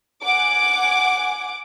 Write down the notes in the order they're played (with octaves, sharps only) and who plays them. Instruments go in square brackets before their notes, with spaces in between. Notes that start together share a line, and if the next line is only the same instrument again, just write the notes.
[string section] F#5 G#5 D6